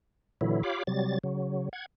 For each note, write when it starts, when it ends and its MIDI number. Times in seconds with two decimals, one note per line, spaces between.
0.41 0.63 46
0.41 0.63 50
0.41 0.63 52
0.41 0.63 54
0.41 0.63 64
0.63 0.83 65
0.63 0.83 67
0.63 0.83 73
0.63 0.83 77
0.63 0.83 83
0.63 0.83 86
0.87 1.18 48
0.87 1.18 54
0.87 1.18 55
0.87 1.18 93
1.24 1.69 49
1.24 1.69 54
1.73 1.86 78
1.73 1.86 92